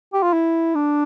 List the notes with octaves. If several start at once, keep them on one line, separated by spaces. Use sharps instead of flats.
G4
F4
E4
D4